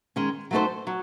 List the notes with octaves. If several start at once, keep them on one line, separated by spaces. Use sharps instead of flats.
D#3 G#3 C#4
F#3 A3 D#4 A4 C5
F#3